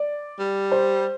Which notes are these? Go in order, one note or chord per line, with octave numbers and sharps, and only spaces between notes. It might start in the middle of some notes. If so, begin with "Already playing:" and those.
Already playing: D5
G3
C5